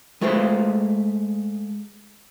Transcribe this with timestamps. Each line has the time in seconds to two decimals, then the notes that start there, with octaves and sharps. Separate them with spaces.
0.21 G#3 A3 F4 B4 C5